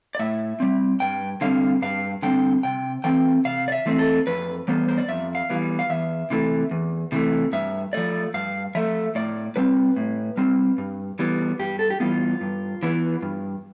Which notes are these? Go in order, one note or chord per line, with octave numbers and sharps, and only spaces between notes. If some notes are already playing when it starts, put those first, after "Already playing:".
D5
A2 E5
G3 C4
G2 G5
D3 G3 C4 F5
G2 F5
D3 G3 C4 G5
C3 G5
E3 A3 C4 G5
C3 F5
D5
E5
E3 A3 C4
A4
F2 B4
E3 G3 B3 C5
C5
D5
F2 E5
F5
E3 G3 B3
F5
E2 E5
C3 E3 A3
E2
C3 E3 A3
G2 E5
F3 A3 D5
G2 F5
F3 A3 E5
A2 D5
G3 C4 B4
A2
G3 C4
G2
E3 G3 B3
G2 G4
A4
G4
E3 G3 B3 F4
G2
E3 B3
G2